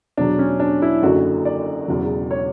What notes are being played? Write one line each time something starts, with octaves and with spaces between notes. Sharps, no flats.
E2 B2 F#3 D4
C#4
D4
E4
F#1 F#2 D3 F#4
D5
E1 E2 C#3 F#3
C#5